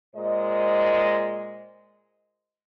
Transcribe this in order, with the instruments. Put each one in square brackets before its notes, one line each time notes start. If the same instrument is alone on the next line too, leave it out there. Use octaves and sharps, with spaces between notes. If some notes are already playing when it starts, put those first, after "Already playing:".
[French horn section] A#2 G#3 C5 D#5